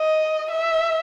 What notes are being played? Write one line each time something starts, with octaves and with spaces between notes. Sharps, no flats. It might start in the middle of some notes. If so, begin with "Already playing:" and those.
Already playing: D#5
E5